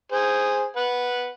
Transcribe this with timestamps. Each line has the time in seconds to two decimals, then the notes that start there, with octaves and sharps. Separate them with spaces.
0.12 G#4 C5
0.76 B4 F#5